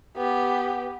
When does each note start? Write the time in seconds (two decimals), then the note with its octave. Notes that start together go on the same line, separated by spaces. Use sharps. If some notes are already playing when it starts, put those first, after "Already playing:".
0.16 B3 G4